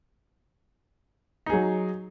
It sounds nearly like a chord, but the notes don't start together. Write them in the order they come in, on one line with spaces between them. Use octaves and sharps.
D#4 G#4 F#3